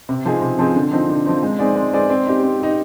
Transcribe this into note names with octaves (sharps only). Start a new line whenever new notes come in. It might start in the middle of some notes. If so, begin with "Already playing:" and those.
C3
F3 C4 D#4 G#4
C3
F3 C4 D#4 G#4
D3
F3 C4 D#4
D3
F3 C4 D#4
G#3
C4 D#4 G#4 D5
G#3
C4 D#4 G#4 D5
C4
D#4 G4
C4
D#4 G4